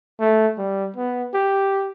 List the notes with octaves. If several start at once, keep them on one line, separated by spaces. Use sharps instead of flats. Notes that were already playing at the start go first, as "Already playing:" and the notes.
A3
G3
B3
G4